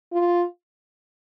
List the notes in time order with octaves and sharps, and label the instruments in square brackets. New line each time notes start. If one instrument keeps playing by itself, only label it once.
[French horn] F4